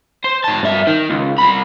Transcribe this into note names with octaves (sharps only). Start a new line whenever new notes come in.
C5
G#2 A5
G2 E5
D#3
C#2
C2 B5